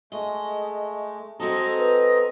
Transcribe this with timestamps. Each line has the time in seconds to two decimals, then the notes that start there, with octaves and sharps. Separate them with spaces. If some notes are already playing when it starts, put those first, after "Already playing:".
0.12 G#3 A3 D#5
1.40 G#3 C4 F#4 A4 D#5 A#5
1.78 B4